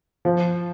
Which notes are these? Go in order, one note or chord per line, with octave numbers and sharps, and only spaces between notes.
F3